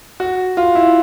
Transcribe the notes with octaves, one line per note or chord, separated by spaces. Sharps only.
F#4
F4
E4